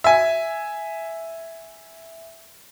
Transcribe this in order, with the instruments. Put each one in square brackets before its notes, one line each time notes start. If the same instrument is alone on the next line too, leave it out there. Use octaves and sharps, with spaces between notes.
[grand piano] E5 G#5